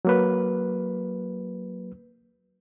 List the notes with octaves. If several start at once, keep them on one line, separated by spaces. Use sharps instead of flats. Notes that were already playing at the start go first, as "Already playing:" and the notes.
F#3 A#3 B4